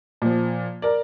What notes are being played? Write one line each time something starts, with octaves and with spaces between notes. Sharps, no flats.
A#2 F3
A#4 D5